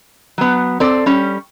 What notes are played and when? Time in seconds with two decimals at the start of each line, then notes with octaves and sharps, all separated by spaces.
0.38 F#3 B3
0.80 C4 A4 D5
1.06 G3 C#4 G4